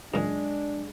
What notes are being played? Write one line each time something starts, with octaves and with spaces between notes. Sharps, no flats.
F#2 A#2 G#3 D4